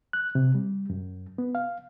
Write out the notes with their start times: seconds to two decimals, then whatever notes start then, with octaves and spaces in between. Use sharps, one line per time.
0.13 F#6
0.35 C3
0.55 G3
0.90 F#2
1.38 B3
1.55 F5